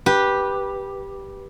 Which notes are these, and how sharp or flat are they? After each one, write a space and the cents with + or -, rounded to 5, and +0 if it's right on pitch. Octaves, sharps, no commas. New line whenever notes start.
G4 +0 B4 -15